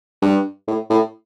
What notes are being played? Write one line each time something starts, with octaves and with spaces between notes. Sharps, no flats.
G2
A2
A2